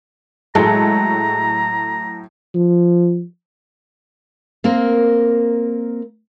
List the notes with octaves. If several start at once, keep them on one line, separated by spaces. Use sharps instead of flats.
A2 F#3 G#3 A4 A#5
F3
A#3 C4 A#4